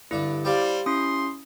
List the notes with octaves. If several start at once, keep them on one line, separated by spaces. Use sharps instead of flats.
G2 D3 D4 E4
G3 G4 C5 D5 F5
C#4 E4 C6 D#6